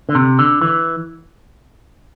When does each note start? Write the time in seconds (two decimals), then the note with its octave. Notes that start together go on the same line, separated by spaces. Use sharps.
0.09 D3
0.15 C3
0.39 D3
0.61 E3